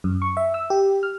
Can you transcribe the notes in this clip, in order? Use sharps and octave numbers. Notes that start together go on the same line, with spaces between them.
F#2
C#6
E5
E6
G4
F6